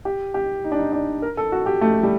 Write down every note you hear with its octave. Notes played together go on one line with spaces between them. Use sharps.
G4
G4
D#4
D4
D#4
D4
A#4
A4
F#4
G4
A3
G3